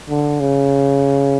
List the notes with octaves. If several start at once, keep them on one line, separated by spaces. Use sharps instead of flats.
D3
C#3